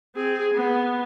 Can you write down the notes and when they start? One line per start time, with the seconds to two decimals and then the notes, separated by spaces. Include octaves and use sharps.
0.16 C4 G#4
0.54 B3